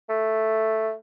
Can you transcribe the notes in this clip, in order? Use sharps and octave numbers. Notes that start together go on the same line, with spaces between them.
A3